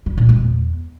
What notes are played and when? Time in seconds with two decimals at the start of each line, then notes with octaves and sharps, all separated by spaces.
0.06 G3
0.18 A#2
0.29 G#3
0.40 E2